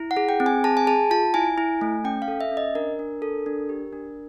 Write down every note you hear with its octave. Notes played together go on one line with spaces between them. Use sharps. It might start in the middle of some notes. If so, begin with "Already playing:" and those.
Already playing: E4
F#5
G#4
G5
C4
G#5
G#4 A5
G#5
G#4 A5
F4 A5
E4 G#5
E4
A3
C#4 G5
F5
A4
E5
C#4
D#5
D4 A#4
D4
A4
D4
G4
D4